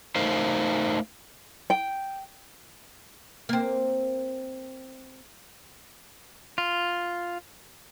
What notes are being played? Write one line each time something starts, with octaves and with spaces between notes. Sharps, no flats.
A3 D#4 A#4 C5 F5
G5
A#3 C4
F4